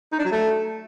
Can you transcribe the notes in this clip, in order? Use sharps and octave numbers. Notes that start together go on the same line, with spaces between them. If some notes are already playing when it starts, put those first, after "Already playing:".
D#4
D4
F#3
A3